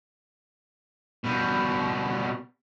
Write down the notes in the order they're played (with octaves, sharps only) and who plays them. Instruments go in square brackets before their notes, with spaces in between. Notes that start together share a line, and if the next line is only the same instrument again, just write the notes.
[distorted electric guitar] B2 G3